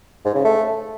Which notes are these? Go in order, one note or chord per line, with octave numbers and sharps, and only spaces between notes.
G#2
C#3
A3